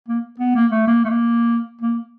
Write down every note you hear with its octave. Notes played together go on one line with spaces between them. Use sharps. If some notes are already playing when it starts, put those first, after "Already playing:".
A#3
B3
A#3
A3
A#3
A3
A#3
A#3